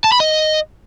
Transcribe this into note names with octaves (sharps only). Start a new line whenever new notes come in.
A5
B5
D#5